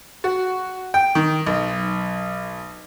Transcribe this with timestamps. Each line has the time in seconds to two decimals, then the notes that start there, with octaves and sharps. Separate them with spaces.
0.24 F#4
0.94 G5
1.15 D#3
1.46 B1